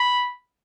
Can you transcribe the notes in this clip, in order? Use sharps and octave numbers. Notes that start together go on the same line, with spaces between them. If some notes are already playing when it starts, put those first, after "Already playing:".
Already playing: B5